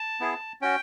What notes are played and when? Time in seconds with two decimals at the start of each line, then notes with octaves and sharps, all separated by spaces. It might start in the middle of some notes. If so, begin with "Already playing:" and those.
Already playing: A5
0.20 B3 E4 G#4
0.61 C#4 F#4 G5